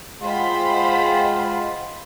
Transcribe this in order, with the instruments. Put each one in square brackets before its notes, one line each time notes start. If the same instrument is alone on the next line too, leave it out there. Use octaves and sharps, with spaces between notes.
[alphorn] G#3 [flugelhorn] F4 [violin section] C5 B5 [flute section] D#5 F#5 G5